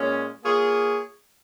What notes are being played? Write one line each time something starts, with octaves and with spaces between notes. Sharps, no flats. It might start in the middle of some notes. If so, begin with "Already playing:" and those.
Already playing: A#2 G#3 C#4
A#3 F4 G#4 C#5